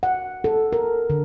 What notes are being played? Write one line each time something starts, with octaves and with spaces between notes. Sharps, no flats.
F#5
A4
A#4
D3